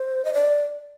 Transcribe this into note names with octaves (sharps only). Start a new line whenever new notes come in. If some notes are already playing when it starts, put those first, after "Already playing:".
Already playing: C5
D#5
D5